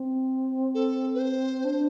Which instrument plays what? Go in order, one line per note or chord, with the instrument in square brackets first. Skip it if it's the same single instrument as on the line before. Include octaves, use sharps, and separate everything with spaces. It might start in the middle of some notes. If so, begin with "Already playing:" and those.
Already playing: [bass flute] C4
[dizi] A4
B4
C5
[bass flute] D4